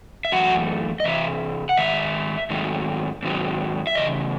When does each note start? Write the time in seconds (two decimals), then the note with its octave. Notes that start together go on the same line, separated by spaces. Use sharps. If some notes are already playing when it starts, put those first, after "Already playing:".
0.25 E5
0.32 F#2 E3 A3 F#4 F#5
1.00 D#5
1.04 C3 E3 E5
1.69 F#5
1.77 G#2 D#3 E5
2.50 G#2 D#3 F#3 A3
3.23 G#2 D#3 F#3
3.87 E5
3.95 E2 C#3 D#5